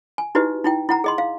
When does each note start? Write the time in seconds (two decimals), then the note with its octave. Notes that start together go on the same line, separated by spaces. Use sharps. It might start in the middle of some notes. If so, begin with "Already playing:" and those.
0.18 G#5
0.35 D#4 E4 F#4 G4 B4 D#5
0.64 D#4 E4 G5
0.89 E4 F#5 A#5
1.04 G#4 D#5 C6
1.18 F5